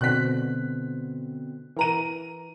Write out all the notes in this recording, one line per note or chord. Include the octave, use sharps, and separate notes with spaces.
B2 D3 C4 F#6 B6
E3 A#4 A#5 D#7